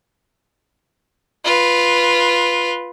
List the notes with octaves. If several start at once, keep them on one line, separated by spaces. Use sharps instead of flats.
F4 B4